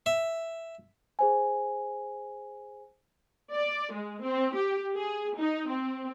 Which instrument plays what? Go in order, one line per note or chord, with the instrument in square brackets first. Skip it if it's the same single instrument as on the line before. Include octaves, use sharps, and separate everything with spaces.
[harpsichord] E5
[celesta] G#4 C5 G#5
[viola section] D5
G#3
C4
G4
G#4
D#4
C4